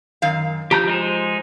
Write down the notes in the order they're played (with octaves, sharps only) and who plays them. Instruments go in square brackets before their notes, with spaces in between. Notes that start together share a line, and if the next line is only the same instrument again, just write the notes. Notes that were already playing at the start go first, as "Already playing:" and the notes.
[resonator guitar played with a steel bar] F#2 D#3 F5
[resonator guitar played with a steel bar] F3 [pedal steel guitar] G4 A#5 G6
[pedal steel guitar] G#3 D#4 C5